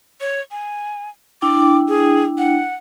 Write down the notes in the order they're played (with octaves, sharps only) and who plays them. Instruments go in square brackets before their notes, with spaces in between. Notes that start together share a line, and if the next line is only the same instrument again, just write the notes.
[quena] C#5
G#5
[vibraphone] D4 E4 G5 [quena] D6
[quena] G#4
F#5